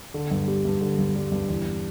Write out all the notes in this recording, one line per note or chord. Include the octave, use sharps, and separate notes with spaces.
D3
G2
G3
G2
D3
G2
G3
G2
E2